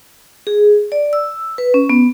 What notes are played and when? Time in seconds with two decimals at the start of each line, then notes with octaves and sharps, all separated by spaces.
0.47 G#4
0.92 D5
1.13 E6
1.58 B4
1.74 C#4
1.90 B3